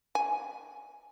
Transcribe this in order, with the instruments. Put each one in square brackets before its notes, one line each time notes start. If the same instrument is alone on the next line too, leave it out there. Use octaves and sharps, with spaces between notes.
[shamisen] G#5